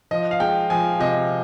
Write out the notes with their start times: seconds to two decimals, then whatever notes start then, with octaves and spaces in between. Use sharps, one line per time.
0.11 F3 D#5
0.31 F5
0.40 G#3 G5
0.70 F3 G#5
1.00 C3 D#5